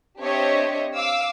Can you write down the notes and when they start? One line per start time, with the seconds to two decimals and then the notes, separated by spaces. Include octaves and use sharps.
0.19 C4 D4 G4 C#5 D#5 E5
0.94 F5 D6 E6